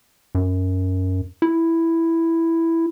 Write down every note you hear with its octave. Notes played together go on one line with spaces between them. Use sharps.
F#2
E4